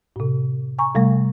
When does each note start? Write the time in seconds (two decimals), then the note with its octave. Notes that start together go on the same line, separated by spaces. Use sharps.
0.16 A2 C3
0.79 G#5 A#5 C#6
0.94 C3 G3 A3